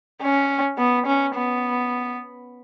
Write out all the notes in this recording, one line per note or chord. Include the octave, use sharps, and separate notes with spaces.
C#4
B3
C#4
B3